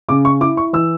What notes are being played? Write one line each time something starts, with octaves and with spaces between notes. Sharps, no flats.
C#3 D6
C#6
E4 D6
C#6
E3 E6